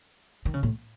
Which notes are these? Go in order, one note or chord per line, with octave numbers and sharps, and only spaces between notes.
D#3
C#3
A2